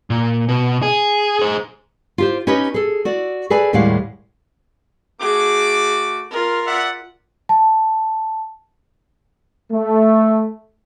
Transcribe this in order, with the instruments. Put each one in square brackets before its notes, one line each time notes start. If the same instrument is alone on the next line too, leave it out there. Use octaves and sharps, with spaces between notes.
[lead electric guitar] A#2
B2
G#4
G#4 C5
[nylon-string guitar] F4 G4 C5
C#4 D#4 G4 B4 C#5 D#5
G#4 A4
F#4 D5
G#4 A4 B4 D5 G#5
D#2 A2 G3 G#3 F5 F#5
[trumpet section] A3 F#4 D6 [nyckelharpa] G#4
[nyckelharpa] F4 A#4
[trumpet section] D5 E5 F#5
[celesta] A5
[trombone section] A3